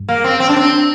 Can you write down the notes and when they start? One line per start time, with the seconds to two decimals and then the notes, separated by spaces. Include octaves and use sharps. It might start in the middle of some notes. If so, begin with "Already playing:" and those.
Already playing: G2
0.09 A#3
0.24 C4
0.40 C4
0.49 D4
0.56 C4